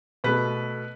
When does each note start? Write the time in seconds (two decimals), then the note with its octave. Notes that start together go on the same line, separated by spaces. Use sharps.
0.24 B2 A3 B4